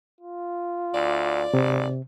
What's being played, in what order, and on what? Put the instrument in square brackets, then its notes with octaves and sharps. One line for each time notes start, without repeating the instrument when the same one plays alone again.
[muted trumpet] F4
[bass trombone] D2 [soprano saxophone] D5
[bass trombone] G#1 [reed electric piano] C3